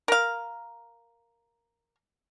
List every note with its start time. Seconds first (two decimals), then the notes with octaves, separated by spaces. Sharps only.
0.08 A#4 F5